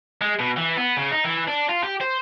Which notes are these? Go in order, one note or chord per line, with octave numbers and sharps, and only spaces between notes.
G#3
B2
E3
B3
C#3
D#4
E3
D4
F4
G4
C5